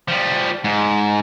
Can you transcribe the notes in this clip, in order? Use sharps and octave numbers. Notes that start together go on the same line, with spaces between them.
F3 G3
G#2